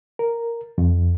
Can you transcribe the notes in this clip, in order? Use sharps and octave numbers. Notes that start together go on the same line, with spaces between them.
A#4
F2